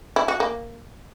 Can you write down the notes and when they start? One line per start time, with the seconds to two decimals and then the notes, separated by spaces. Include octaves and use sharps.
0.16 E4
0.28 F#4
0.40 A#3